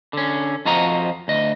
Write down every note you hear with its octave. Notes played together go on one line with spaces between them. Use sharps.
D3 C#4
F2 F3 F4 F#4 D#5 A#5
D2 D#5